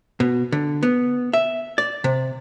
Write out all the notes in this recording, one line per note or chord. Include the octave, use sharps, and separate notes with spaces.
B2
D3
B3
E5
D5
C3